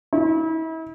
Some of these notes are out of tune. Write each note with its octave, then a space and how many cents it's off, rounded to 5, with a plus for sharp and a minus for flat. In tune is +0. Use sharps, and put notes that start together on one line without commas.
E4 -35